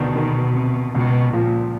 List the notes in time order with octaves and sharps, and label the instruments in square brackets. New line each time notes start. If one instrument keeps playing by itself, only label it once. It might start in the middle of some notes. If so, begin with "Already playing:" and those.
Already playing: [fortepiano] D2 D#3 [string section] B2
[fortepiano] D#3
C3
[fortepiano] C#2 [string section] B2
[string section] A#2 [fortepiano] F3